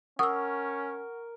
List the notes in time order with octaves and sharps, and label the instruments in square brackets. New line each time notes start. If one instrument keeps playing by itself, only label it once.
[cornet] C#4 [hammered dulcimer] A#4 [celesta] F#5 C#6 [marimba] D#6 E6